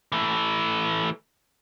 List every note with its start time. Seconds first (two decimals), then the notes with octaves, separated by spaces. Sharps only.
0.12 E3 A3